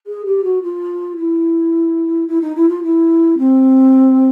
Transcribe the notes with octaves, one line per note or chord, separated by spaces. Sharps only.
G#4
G4
F#4
F4
E4
E4
D#4
E4
F4
E4
C4